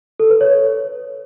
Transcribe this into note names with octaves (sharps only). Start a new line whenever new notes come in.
A4
B4
C#5